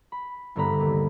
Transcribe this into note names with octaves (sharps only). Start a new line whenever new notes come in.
B5
C2 G2 D3 B3 A#5 B5
D#2